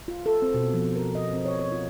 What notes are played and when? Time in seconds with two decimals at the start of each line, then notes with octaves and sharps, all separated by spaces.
0.08 F4
0.26 A4
0.42 C4
0.54 B2
0.74 F3
0.96 A#4
1.15 D#5
1.33 C4
1.45 C#5
1.59 C#5
1.72 F4